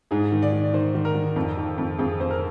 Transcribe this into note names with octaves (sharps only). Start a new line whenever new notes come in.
G#2 G#4
D#3
D5
D#3
D#3 C5
D#3
A#4
D#3
F2
D#3
F2
F2 G#4
F2 C5
A#4